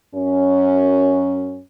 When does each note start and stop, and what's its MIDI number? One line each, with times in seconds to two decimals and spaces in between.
0.14 1.61 42
0.14 1.61 61